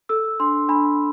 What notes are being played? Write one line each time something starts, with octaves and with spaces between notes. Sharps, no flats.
A4 E6
D4 C6
D4 B5